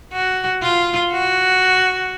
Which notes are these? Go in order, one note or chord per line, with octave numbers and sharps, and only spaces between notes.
F#4
F4
F#4